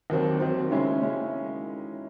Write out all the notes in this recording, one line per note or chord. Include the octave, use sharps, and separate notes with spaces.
D#2 D#3 F#3 C4
D#2 D#3 F#3 C4
C#3 G#3 C#4 E4
C#3 G#3 C#4 E4